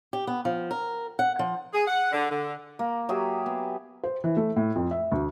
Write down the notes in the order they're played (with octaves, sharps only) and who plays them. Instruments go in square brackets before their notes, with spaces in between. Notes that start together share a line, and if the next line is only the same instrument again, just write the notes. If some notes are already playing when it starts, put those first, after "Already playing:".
[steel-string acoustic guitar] G4
B3
F3
A#4
F#5
F3
[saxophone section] G#4
F#5
D3
D3
[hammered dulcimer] A#3
F#3 G4 G#4 E5
B3
[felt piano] C5
E3
A3
A2
F2
E5
D2